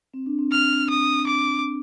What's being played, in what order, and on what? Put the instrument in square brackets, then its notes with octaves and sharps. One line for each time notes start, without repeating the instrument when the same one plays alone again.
[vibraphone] C4
D4
C4
[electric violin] F6
D#6
D6